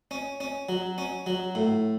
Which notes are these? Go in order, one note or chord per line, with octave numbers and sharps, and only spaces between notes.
C#4
C#4
F#3
C#4
F#3
A2